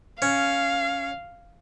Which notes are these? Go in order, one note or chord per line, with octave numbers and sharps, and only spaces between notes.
C#4 F5